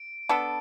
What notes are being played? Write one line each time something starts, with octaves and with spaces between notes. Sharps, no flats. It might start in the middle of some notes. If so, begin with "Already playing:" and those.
Already playing: D7
B3 D4 A4